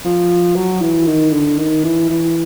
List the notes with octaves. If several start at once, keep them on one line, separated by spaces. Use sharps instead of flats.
F3
F#3
E3
D#3
D3
D#3
E3
E3